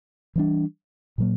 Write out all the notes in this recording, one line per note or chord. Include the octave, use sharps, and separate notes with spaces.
E3 G3 B3 D4
A#2 F#3 A#3